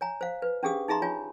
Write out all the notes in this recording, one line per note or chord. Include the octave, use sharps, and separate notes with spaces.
C#5 G#5 A#5
C5 F5
B4
C#4 D4 G4 G#4 F5 D#6
D#4 G#4 E5 A#5 C6
F4 C#5 G#5